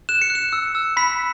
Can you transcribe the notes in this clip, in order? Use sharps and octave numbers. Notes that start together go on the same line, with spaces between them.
F#6 E7
C#7
F#6
E7
E6
E6
B5 B6